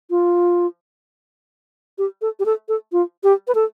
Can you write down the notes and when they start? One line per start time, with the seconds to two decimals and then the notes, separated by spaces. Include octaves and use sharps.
0.10 F4
1.98 G4
2.22 A4
2.39 G4
2.45 A4
2.68 A4
2.92 F4
3.23 G4
3.48 B4
3.55 A4